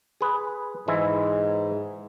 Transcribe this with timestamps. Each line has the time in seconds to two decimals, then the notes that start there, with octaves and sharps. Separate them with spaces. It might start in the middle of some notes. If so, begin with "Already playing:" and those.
0.21 G#4 B4
0.88 G#2 E3 G#3 E4